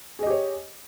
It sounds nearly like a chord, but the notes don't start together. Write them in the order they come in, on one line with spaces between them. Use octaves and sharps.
G#4 D#5 G4 C#5